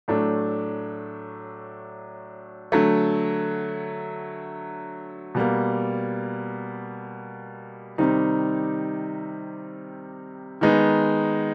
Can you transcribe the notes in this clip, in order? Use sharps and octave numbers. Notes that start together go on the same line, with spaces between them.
A2 F#3 A3 D4
D3 F#3 A3
B2 G3 A#3
C3 D#3 G3 C4 D#4
D#3 G#3 B3 D#4